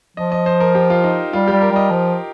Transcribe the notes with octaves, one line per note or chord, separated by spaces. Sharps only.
F3 D#5
D#5
C5
A#4
G4
F4
D#4
G3 F4
G3 G4
A#4
G3 D#5
F3 D#5